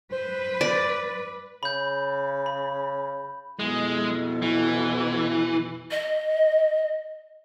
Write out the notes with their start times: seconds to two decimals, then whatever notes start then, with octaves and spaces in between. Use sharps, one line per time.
0.12 B4 C5
0.61 D5
1.63 C#3 B5 G6
2.46 B5
3.59 F2 B2 G#3 E4
4.42 E3
5.91 D#5